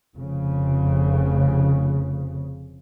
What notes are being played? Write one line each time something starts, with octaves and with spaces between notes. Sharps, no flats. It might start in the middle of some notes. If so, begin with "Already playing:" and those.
F1 F2 C#3